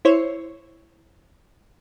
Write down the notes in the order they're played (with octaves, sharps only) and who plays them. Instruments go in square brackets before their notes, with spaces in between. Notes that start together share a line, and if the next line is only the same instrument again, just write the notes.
[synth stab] E4 C5 C#5